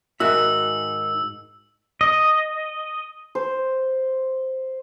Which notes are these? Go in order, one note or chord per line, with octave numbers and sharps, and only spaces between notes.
G#2 D#3 F#4 E5 E6
D#5
C5